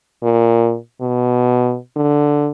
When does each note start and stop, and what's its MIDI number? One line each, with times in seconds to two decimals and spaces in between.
0.23 0.76 46
1.02 1.77 47
1.96 2.51 50